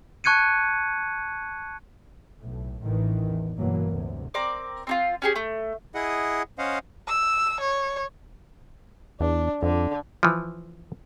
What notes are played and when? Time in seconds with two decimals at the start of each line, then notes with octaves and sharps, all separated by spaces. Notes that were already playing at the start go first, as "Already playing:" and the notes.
0.24 A5 C#6 F#6 G#6 C#7 D#7
2.39 B1 A2
2.82 A1 A2 D#3 E3
3.23 E2
3.57 G2 B2 E3 F#3 A#3
3.89 D2 C3
4.34 C4 A#4 D5 D6
4.87 C4 D#4 F4
5.22 C#4 G4 G#4
5.36 A3
5.95 E4 G#4 D#5 F#5
6.58 C#4 C5 D#5 F5 F#5
7.07 E6
7.61 C#5
9.20 E2 D4
9.63 F2 D3
10.23 E3 F3